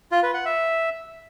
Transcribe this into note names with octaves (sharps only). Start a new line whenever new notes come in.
F4
B4
F#5
E5